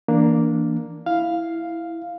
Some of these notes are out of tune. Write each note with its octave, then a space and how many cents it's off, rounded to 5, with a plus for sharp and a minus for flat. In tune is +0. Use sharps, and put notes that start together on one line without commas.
E3 +0 A#3 +0 D4 +0
E4 +0 F5 +0